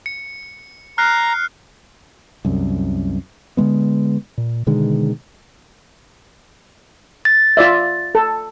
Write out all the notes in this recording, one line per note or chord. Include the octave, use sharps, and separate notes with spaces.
C#7
A#5 F6 F#6 C7
C2 F#2
D3 F3 G#3 B3
A#2
B2 D3 D#3 G#3
A6
F4 D5 E5
A4